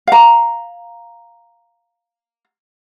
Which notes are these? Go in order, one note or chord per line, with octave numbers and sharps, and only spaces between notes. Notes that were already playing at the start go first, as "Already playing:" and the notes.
F5 A#5